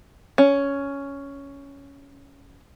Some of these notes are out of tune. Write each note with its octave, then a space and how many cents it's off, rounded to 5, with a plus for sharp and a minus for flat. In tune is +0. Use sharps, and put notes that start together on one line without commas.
C#4 +10